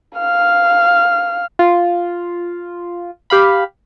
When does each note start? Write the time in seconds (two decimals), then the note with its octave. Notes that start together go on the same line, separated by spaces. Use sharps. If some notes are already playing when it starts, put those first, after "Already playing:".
0.19 F5 F6
1.59 F4
3.30 G4 F5 B5